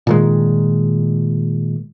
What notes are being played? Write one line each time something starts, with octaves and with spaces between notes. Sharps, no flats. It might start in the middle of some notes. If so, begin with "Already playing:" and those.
A#2 D#3 G#3